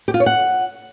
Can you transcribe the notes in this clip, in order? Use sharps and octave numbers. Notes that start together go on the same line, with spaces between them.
G4
F4
C#5
F#5